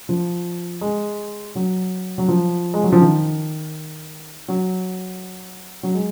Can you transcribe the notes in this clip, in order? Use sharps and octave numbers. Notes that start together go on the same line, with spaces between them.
F3
G#3
F#3
F#3
F3
G#3
F#3
F3
D#3
F#3
F#3
G#3